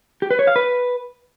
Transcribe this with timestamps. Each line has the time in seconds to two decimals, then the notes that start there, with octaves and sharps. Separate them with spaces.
0.22 G4
0.31 B4
0.39 C#5
0.47 F5
0.56 B4